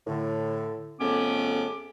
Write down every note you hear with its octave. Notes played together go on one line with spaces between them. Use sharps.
A2 D3
F2 C#3 A3 B3 C#4 D6